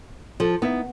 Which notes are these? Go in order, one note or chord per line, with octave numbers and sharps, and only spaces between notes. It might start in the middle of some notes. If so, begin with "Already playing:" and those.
F3 A4
B3 D#4 E4 E5